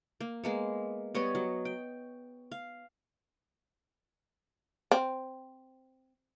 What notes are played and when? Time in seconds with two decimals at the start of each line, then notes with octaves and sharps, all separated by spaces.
0.20 A#3
0.44 G#3 A#3 B3
1.15 G3 B3 C#5 D#5
1.35 F#3
1.65 G5
2.51 F5
4.91 C4